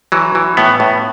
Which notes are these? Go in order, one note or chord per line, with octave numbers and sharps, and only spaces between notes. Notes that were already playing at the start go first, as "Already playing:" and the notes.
E3 F#3
E3
A2 B3
A2